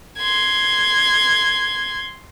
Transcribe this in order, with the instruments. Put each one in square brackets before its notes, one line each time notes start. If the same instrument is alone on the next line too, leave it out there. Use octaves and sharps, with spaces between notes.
[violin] C6 G#6